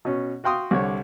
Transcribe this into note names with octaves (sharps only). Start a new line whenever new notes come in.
B2 C#4
F#4 F5 G5 C6 D#6
C2 D3 C#5